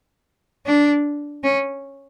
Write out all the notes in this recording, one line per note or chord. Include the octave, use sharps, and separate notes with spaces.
D4
C#4